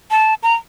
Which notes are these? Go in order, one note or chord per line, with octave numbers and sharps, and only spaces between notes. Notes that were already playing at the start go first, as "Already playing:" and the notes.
A5
A#5